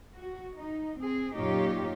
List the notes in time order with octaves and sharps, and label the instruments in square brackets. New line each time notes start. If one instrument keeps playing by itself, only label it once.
[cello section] F#4
D#4
C4 G#4
F#2 A#2 D#4 F4 G4 C#5